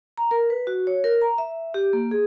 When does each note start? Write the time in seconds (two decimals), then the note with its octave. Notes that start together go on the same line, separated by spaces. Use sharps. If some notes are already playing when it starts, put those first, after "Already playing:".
0.18 A#5
0.31 A#4
0.50 B4
0.67 F#4
0.87 C#5
1.04 A#4
1.21 A#5
1.38 E5
1.74 G4
1.93 A#3
2.11 G#4